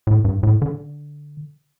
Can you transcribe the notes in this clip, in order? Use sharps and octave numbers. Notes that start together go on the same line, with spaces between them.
A2
G2
A2
D3